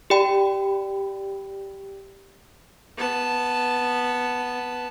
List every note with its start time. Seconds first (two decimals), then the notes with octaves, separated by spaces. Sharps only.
0.10 G4 D5 G5 B5
2.97 B3 A5